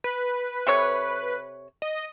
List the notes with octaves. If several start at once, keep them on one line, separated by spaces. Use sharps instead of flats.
B4
C3 A4 C#5
D#5